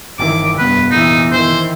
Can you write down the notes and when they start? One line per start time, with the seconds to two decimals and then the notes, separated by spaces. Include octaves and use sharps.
0.19 G1 A#2 D#3 E3 D6
0.59 F1 G2 B3 B4
0.91 A#2 E3 D#4
1.32 D#3 E3 C5